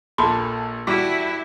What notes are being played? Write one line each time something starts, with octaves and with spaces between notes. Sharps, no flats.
A#1 A#2 A4 B5 C6
G3 E4 F#4 D6